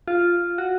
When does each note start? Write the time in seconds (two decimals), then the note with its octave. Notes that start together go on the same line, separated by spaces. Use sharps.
0.08 F4
0.58 F#4